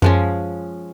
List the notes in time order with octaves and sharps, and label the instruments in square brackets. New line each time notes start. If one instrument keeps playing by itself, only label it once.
[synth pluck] F#2 [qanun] F3 G#3 C#4